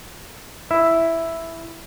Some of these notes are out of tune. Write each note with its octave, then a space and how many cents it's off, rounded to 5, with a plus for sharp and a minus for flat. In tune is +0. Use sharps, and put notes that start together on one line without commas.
E4 +0 E5 +0